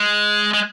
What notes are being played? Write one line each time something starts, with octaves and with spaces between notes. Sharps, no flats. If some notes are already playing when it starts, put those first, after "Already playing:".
Already playing: G#3
G#3